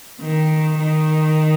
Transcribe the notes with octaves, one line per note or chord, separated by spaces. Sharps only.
D#3
D#3